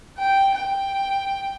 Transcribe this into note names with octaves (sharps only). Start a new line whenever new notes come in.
G5
G5